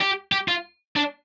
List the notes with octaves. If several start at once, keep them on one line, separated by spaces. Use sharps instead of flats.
G4
G4
F4
D4